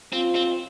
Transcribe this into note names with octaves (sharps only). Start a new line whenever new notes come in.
C4 F4
C4